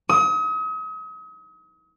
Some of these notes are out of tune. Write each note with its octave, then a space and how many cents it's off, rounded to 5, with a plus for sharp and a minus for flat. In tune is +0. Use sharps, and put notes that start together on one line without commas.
D#6 +40